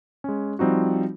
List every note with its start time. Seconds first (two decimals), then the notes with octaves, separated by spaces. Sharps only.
0.24 G#3 C#4
0.59 F3 G3 C4 D#4 F#4